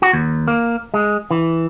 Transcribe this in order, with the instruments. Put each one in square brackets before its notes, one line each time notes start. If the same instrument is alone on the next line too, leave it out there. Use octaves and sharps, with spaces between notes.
[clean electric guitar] F#4
D#2
A#3
G#3
E3